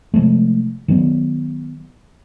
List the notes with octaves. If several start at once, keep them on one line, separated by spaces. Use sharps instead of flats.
C3 F3 G#3 A3
D#3 F#3 A#3 B3